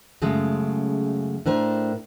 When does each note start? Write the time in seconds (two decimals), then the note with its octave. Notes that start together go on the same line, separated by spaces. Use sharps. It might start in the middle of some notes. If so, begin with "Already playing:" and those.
0.22 F#2 C#3 G#3 A3
1.46 A2 D4 A#4 C5